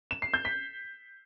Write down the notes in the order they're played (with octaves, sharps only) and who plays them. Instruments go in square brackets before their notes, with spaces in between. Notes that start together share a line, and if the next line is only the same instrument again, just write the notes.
[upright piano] E7
C7
G6
B6